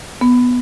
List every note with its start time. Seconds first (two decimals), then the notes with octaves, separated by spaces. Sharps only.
0.21 B3